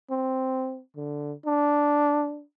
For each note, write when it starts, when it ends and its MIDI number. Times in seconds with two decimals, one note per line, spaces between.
0.11 0.81 60
0.96 1.33 50
1.46 2.43 62